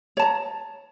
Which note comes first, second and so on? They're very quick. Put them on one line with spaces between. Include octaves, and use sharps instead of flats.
C#5 A5 A#5